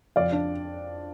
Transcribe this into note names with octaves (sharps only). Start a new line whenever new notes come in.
F2 D5 F5
D4